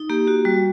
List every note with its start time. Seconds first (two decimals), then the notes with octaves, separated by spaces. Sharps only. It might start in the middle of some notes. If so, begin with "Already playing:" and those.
Already playing: D#4
0.10 A#3 G4
0.27 F#4
0.45 G3 F#4